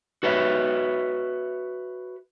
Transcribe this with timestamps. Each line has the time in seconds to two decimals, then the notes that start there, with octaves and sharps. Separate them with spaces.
0.23 F#4 B4 C#5 E5